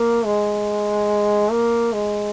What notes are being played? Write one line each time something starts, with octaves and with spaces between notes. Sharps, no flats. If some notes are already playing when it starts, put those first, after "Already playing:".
Already playing: A#3
G#3
A#3
G#3